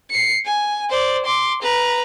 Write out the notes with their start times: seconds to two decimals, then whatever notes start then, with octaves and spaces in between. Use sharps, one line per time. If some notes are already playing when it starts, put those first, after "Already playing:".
0.11 C7 C#7
0.46 G#5
0.89 C5 D5
1.25 C6 D6
1.62 B4 A#5